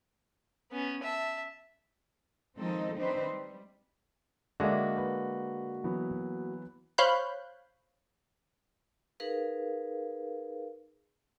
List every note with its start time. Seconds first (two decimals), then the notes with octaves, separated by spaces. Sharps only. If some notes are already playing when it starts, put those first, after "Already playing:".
0.71 B3 C#4
1.03 E5 A5
2.58 D#3 F3 G#3 C4 D#4 A4
2.98 D#3 C4 D4 D#4 B4 C5
3.33 G3
4.60 D3 G#3 A#3 D4 F#4 E5
4.97 B4
5.84 E3 F#3 B3
6.98 C5 C#5 F5 B5 F#6 G6
9.20 D#4 G#4 A#4 B4 F5